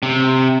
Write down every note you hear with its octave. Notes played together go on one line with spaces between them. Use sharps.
C3